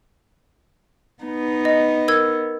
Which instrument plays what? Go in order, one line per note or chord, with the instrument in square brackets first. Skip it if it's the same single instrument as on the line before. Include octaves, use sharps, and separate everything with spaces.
[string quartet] B3 D#4
[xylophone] D#5
A#4 E6 G#6